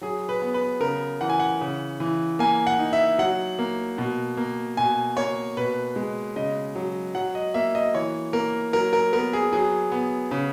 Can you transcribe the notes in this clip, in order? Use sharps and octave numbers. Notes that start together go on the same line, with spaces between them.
F#3 G#4
B4
B3
B4
C#3 A#4
E3 F#5
G#5
F#5
C#3
E3
A#3 G#5
F#5
D#4
E5
F#3 F#5
A#3
B2
A#3
B2 G#5
A#3 C#5
B2 B4
G#3
C#3 D#5
F#3
F#3 F#5
D#5
A#3 E5
D#5
E3 C#5
A#3 A#4
F#3 A#4
A#4
B3 A#4
G#4
F#3 G#4
B3
C#3